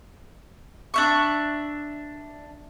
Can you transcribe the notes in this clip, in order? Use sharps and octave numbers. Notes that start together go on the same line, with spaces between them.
D4 E5 C#6